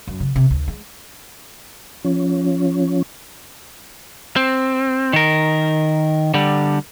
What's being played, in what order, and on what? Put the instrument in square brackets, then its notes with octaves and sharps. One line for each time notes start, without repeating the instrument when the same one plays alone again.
[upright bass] F#2
C#3
C3
D2
G#3
[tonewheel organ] F3 C#4
[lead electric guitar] C4
D#3 A#4
D3 G3